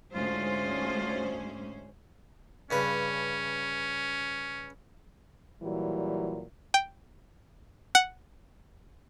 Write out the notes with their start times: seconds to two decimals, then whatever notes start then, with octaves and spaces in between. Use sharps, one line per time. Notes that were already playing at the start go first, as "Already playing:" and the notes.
0.15 D2 G#2 C#4 F4 C5
2.71 G2 C#3 C#4 B4
5.63 A#2 E3 F#3 G3
6.74 G5
7.95 F#5